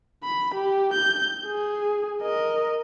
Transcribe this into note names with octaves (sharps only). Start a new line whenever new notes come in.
B5
G4
G6
G#4
A#4 D#5